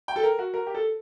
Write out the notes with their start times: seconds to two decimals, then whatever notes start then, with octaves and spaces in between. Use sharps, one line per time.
0.08 G5
0.16 A4
0.23 A#4
0.39 F#4
0.54 A#4
0.66 G4
0.75 A4